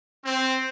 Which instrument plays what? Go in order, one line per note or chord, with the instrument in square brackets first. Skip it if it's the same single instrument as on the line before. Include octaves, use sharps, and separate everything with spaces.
[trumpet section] C4